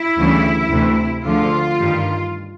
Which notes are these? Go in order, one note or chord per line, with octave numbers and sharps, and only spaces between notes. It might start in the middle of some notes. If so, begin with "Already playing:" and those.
Already playing: E4
D2 C#3 E3 G3
D2 C3 E3 A3
D2 D3 F3 G#3 F4
G2 D#3 G3